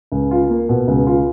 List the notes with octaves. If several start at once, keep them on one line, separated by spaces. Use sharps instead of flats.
C#2
F4
A#3
B2
C#2
F4